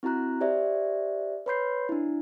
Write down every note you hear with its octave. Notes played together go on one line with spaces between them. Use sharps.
C4 E4 F#4 A#5 F#6
G4 C5 D5 E5
B4 C#5 B5 C6 G6 C7
D4 E4